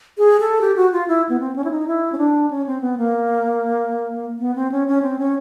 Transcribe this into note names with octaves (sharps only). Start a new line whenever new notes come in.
G#4
A4
G4
F#4
F4
E4
B3
C4
C#4
E4
D#4
E4
C#4
D4
C#4
C4
B3
A#3
B3
C4
C#4
C#4
C4
C#4